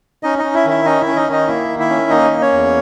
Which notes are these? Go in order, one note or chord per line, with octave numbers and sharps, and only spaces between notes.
C#4 D#4 D#5
D#4 D#5
C#4
E4 E5
D#3 E4 E5
C#4 D#4 D#5
E4 E5
C#4
D#4 D#5
D#3 D#4 D#5
A#3 E4 E5
D#3
E4 E5
C#4
A#3 D#4 D#5
A#3
C#4 C#5
E2